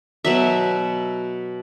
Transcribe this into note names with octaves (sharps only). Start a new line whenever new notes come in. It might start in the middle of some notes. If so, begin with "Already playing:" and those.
B2 F#3 E5